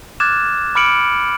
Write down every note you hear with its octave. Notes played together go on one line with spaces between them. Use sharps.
D6 F6 F#6 G#6 A6 E7
B5 D6 F6 C#7 D7 F#7